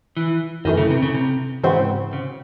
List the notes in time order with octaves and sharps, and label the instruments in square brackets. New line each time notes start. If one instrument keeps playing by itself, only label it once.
[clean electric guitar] E3
[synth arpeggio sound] F#2 E3 A3 [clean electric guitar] D#3
[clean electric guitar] C#3
C3
C#3
C3
[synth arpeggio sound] G#2 E3 C4 F#4 C5 [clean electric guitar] C#3
[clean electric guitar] C#3